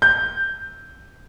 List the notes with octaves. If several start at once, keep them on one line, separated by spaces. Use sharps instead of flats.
G6